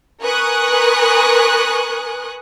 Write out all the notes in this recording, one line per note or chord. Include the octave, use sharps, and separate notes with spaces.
A#4 B4 G#5 C#6 D#6 F#6